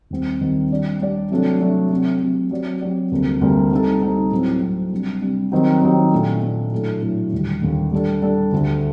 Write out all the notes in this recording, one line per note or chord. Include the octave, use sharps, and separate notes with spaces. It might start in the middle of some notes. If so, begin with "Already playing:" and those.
D#2 D#3 G3 C4
D#2 D#3 G3 C4
G3 D4 G4 D5
G3 D4 G4 D5
C3 F#3 A3 D4 A4
C3 F#3 A3 D4 A4
C3 F#3 A3
C3 F#3 A3
F#3 C4 G4 D5
F#3 C4 G4 D5
D2 C3 G3 A#3
D2 C3 G3 A#3
G3 C4 D#4 A4
G3 C4 D#4 A4
A2 F#3 C4
A2 F#3 C4
C3 G3 D4
C3 G3 D4
D#3 F#3 C4 D#4 G4
D#3 F#3 C4 D#4 G4
A#2 A3 D4
A#2 A3 D4
A2 F#3 A3 D4 A4
A2 F#3 A3 D4 A4
D#2 D3 G3
D#2 D3 G3
G3 D4 A4
G3 D4 A4
D2 D3 A3